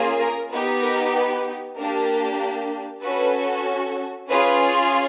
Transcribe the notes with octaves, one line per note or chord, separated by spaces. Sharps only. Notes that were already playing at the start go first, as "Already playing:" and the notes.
Already playing: A#3 C#4 F4 G#4
A#4
B3 D#4 G4
A#4
B4
A#3 D4 G4 A#4
C#4 F#4 A4 B4
C#4 F4 G#4 B4